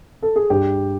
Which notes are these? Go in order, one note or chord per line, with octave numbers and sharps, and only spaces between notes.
A4
G#4
G2 G4